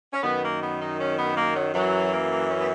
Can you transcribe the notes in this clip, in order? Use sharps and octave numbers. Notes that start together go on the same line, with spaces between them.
C#4
F#2 D#3 B3
A#3
B3
D#4
C#4
B3
A#3
F#3
F#2 E3 F#3
A#3
A#3
C#4
B3